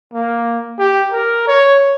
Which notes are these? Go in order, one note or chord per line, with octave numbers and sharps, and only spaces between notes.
A#3
G4
A#4
C#5